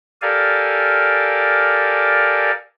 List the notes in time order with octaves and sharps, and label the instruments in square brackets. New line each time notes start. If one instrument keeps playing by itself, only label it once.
[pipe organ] G4 A4 A#4 D5 F5 G#5